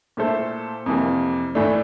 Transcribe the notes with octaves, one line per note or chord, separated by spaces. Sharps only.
A#2 A3 E4 A4 C5
F2 C3 E3 A#3
A2 E3 A3 D4